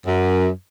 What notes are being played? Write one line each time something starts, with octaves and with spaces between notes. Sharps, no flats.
F#2